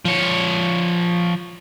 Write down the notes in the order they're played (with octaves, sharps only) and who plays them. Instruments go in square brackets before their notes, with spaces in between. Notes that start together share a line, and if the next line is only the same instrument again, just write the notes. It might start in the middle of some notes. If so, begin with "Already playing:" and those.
[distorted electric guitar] F3 C#5